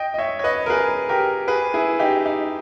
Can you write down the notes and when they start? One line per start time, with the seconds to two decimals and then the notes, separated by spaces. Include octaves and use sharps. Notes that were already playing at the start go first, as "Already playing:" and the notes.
Already playing: D#5 G5
0.14 D#5
0.18 C#5 E5
0.39 C#5
0.44 B4 D#5
0.66 A#4
0.70 G#4 B4
1.09 G4 A#4
1.48 G#4 B4
1.74 E4 G#4
1.99 D#4 G4
2.26 D#4